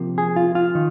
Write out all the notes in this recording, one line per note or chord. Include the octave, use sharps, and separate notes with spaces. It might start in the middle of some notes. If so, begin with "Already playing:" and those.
Already playing: C3 F3 A#3
G#4
F4
F4
D#3